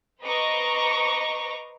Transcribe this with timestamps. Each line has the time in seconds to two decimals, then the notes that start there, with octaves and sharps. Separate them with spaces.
0.22 B4 C5 D#5 A#5 C#6 D6